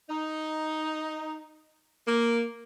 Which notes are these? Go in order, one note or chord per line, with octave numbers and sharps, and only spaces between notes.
D#4
A#3